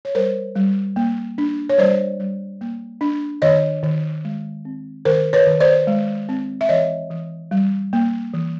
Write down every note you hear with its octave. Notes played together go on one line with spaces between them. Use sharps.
C#5
G3 A#4 C5
G3
A#3
D4
C#5
G3 C5 D5
G3
A#3
D4
D#3 C#5 D#5
D#3
G#3
C4
D#3 A#4 C5
B4 C#5
D#3
C5 D5
G#3
C4
E5
E3 C#5 D#5
E3
G3
A#3
E3